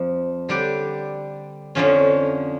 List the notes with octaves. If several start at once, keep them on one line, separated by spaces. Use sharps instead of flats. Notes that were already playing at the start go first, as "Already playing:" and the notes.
Already playing: F2 F3
D3 G3 D4 G4
F2 D3 F3 C#4